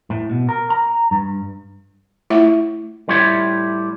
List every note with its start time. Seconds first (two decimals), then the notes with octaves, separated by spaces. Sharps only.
0.10 A2
0.31 B2
0.49 A#4
0.70 A#5
1.11 G2
2.30 A3 E4 F4 C#5 E5
3.08 A2 G3 F4 G4 C#5 E5